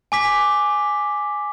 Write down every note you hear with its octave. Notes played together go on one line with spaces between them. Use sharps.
G#5 D6 B6